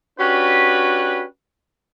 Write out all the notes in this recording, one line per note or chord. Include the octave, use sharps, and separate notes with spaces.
C#4 D4 F#4 G4 B4